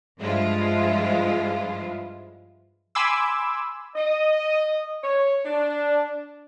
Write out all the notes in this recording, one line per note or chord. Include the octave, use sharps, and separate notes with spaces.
G2 F3 G#3 E4 F4
G#5 B5 C6 D6 E6
D#5
C#5
D4